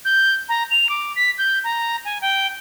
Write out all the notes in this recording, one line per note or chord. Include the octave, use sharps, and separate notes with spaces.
G6
A#5
F7
D6
B6
G6
A#5
G#5
G5